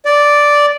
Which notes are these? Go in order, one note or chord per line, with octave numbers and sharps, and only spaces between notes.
D5